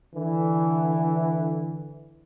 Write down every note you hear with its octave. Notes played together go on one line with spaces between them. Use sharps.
D3 E3